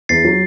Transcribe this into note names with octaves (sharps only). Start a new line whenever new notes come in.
E2 A6 C7
F#3